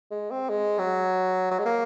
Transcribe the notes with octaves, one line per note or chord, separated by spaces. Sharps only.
G#3
C4
G#3
F#3
F#3
G#3
A#3